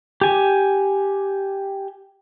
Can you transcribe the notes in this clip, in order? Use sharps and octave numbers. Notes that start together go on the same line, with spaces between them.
G4 G#5